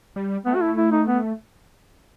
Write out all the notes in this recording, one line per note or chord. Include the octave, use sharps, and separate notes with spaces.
G3
A3 B3
F#4
E4
E4
D#4
B3